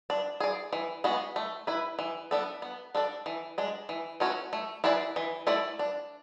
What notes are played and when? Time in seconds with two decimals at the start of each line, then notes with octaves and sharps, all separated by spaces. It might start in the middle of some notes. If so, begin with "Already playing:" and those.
0.10 D4
0.40 G#4 D5
0.73 E3
1.04 G#3 B3 F#4
1.36 A3
1.67 E4 B4
1.99 E3
2.31 B3 D4 A4
2.62 B3
2.95 D4 A4 D5
3.26 E3
3.58 G#3 D4
3.89 E3
4.20 A3 C#4 F#4 C#5
4.53 A3
4.84 E4 G#4 B4 D5
5.16 E3
5.47 A3 E4 A4 D5
5.79 D4